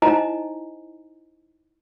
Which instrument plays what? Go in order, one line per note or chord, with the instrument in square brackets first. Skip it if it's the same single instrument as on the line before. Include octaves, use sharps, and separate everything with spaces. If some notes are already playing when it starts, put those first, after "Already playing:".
[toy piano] D#4 E4 C5 D#5 G#5 A#5